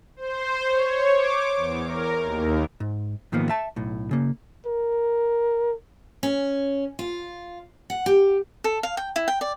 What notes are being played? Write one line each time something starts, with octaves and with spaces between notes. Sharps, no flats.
C5
C#5
D6
E2
A#4
D#2
G#2
G#2 D#3 F3 A#3 B3
E5 A5
B1 A2
C#3 A#3
A#4
C#4
F4
F#5
G4
A4
F5
G5
E4
G5
D5